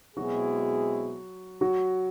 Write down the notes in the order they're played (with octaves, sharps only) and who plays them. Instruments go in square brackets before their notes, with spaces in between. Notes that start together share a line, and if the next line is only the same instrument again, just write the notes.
[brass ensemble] B2 G#3 C4 E4 G#4 [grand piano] F#3 F#4
[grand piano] F#3 F#4